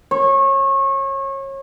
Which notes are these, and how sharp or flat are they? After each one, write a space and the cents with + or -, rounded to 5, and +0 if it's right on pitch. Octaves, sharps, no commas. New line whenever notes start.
C#5 -30